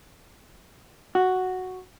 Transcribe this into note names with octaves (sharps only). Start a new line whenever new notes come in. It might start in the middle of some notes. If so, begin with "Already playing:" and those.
F#4